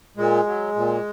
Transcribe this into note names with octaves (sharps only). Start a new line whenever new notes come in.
A#2 G#3
F#3
A#2